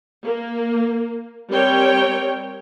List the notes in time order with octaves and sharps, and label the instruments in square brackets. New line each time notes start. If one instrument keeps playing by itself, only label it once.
[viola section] A#3
G3 C4 A#4 C#5 G5